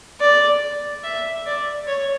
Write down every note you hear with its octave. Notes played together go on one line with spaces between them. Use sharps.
D5
E5
D5
C#5